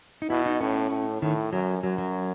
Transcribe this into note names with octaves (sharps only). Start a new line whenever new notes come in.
D#4
B2 E4
D#4
A2 C#4
A2
A2 D#3
F#2 F#3
F#2 F#3
F#3